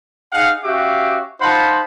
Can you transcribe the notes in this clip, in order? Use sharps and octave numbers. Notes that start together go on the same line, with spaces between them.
D#4 G#4 F5 F#5
C#4 F#4 G4 E5 F5 D6
D#4 F4 C5 F#5 A5 B5